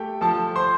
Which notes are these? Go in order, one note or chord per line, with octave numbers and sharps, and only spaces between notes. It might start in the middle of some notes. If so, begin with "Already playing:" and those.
Already playing: A3 G4 G5
F3 A4 A5
C5 C6